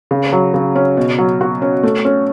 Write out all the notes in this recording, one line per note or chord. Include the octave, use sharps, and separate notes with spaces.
C#3
F#3
C#3
C#4
B2
F#3
F#4
C#4
A3
C#4